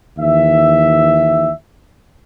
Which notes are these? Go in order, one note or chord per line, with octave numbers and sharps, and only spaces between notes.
D#2 E3 E5